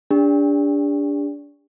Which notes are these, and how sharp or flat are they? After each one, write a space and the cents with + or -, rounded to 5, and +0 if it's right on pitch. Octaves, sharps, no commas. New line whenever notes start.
D4 -20 G4 +45